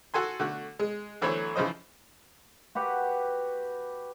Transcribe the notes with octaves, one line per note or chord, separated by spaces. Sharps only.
F#4 A4 G#5 C6
D3 A3 F#4 F#5
G#3
D3 E3 F#3 A3 C5 C#5
C#3 E3 F3 C5 D#5
F#4 G4 B4 F#5